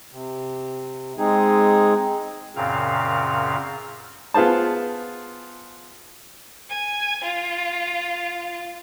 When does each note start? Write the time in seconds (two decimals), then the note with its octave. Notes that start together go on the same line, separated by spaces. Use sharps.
0.12 C3
1.18 G#3 C4 D#4 G#4
2.56 F#2 A#2 C#3 C4 F5
4.34 B3 F4 G#4 C5 A5
6.69 G#5
7.23 F4